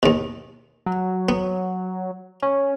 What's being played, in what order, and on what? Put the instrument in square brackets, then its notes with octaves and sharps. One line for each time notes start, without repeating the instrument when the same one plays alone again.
[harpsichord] D#2 B2
[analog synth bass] F#3
[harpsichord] B3
[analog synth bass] C#4